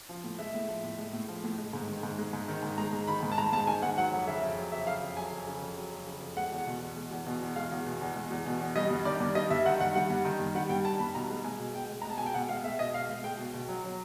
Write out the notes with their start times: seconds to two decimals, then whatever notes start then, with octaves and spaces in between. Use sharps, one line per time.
0.09 F3
0.24 A2
0.39 G#3 E5
0.54 A2
0.69 F3
0.83 A2
0.98 G#3
1.13 A2
1.28 F3
1.43 A2
1.58 G#3
1.73 G#2
1.88 D#3
2.03 G#2
2.18 G#3
2.33 G#2
2.48 D#3
2.63 G#2
2.78 G#3 A#5
2.93 G#2
3.07 D#3 B5
3.23 G#2
3.32 A5
3.38 G#3 A#5
3.52 G#2 A5
3.67 D#3 G#5
3.82 G#2 F#5
3.97 F#3 F#5
4.12 F2
4.27 C#3 E5
4.42 F2
4.57 F#3
4.72 F2 E5
4.86 C#3 F5
5.02 F2
5.17 F#3 G#5
5.31 F2
5.47 C#3
5.62 F2
5.76 F#3
5.92 F2
6.07 C#3
6.21 F2
6.36 G#3 F#5
6.52 E2
6.67 B2
6.81 E2
6.96 G#3
7.11 E2
7.26 B2
7.41 E2
7.56 G#3 F5
7.71 E2
7.86 B2
8.01 E2
8.16 G#3
8.30 E2
8.46 B2
8.60 E2
8.76 G3 D#5
8.90 G2
9.05 D#3 D5
9.20 G2
9.35 G3 D#5
9.50 G2 E5
9.65 D#3 F#5
9.80 G2 F#5
9.95 G3 F#5
10.10 G2
10.25 D#3
10.39 G2
10.55 G3 F#5
10.69 G2 G5
10.85 D#3 A5
10.99 G2 B5
11.15 B2 A#5
11.30 G#3
11.44 G#3 G#5
11.60 B2
11.74 B2 G5
11.89 G#3
12.02 A#5
12.05 G#3 A5
12.18 B2 G#5
12.26 G5
12.34 B2 F#5
12.49 G#3 F5
12.64 G#3 E5
12.79 B2 D#5
12.94 B2 F5
13.09 G#3
13.24 G#3 G5
13.39 B2
13.54 B2
13.69 F#3
13.84 F#3